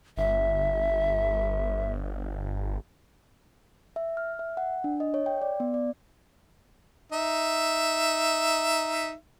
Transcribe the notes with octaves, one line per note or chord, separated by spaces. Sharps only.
G1 E5
E5
F6
E5
F#5
D4
D#5
C#5
G5
D5
B3
D5
D#4 E5